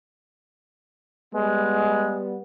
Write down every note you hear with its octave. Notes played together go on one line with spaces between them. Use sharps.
G3 G#3 B3